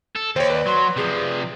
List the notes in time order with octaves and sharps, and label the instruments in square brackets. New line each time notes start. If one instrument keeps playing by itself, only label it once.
[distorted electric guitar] A4
[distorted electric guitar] D#2 [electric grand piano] C5 C#5 [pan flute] G5
[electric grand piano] B4 D5
[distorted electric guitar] F#3 [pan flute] C6
[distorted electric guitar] C3 F3 [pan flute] G#4